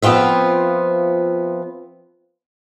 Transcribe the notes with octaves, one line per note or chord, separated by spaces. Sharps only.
F3 B3 C4 F4 E5